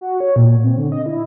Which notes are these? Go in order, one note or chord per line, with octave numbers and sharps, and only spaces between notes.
F#4
C#5
A#2
C4
D3
D#5
E4